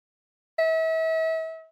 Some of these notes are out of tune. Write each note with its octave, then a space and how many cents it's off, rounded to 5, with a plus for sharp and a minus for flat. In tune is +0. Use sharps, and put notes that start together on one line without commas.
E5 -35